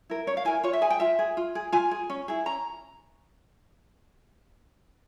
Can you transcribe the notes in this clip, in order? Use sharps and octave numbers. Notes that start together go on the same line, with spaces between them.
E4 A#4
C#4 C#5
F5
E4 A#4 G#5
F4 C#5
E5
G#4 G#5
G5
F4 E5
G#4
F4
G#4
F4 G#5
G#4
C#4
E4 G#4
C#4 A#5